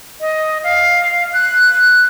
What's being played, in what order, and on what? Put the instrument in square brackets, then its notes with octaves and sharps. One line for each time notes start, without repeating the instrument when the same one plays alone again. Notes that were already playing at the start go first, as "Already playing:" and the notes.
[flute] D#5
F5
F#6